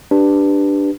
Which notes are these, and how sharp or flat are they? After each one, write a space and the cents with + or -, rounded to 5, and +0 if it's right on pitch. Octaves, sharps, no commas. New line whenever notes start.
D4 +5 G4 +0 B4 +0